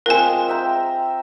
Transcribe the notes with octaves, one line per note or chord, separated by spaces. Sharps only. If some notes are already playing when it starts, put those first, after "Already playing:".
G#3 C4 F4 A#4 G#5
E5 G5 A#5